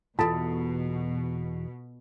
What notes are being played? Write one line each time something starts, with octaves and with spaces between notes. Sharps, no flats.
B1 E2 B2 F4 A4 A5